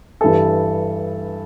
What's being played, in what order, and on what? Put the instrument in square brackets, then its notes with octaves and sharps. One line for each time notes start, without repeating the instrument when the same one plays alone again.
[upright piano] G2 E3 G3 A4